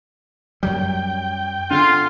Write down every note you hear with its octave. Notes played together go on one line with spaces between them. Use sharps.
F#2 F#3 G3 G5
D3 F4